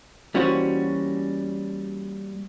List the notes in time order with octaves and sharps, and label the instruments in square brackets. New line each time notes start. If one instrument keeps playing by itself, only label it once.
[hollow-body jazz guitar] E3 G3 A#3 C#4 F#4 C5